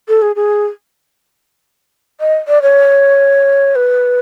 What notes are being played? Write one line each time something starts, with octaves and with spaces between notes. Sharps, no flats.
A4
G#4
G#4
D#5
D5
C#5
B4